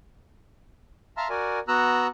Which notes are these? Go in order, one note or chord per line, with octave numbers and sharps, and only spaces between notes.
E5 F5 A5 A#5 C6 F6
F#4 A#4 D5 G#5
B3 F#4 A#5 E6 F#6